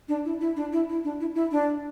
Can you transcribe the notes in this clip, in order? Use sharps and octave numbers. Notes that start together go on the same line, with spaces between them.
D4
E4
E4
D4
E4
E4
D4
E4
E4
D4